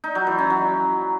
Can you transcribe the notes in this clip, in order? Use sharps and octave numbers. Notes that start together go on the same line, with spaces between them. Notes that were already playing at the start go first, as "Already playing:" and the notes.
D#4
F#3
E3
C#4
F#3